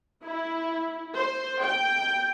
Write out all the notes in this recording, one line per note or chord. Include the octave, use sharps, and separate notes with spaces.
E4
C5
G5